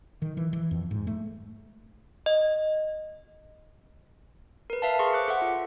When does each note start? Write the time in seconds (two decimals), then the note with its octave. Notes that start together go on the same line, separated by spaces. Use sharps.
0.22 D#3
0.37 E3
0.53 E3
0.71 F2
0.91 G#2
1.07 A3
2.26 D#5
4.70 A#4 B4
4.82 B4 E5 F5 A5
4.99 G#4 C6 C#6
5.13 C5 D6 F#6 C#7
5.28 A4 E5 F#5
5.42 F4